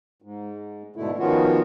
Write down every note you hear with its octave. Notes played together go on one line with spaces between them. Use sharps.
G#2
G#2 B2 D3 A3 E4
D#3 F3 B3 C#4 F4 F#4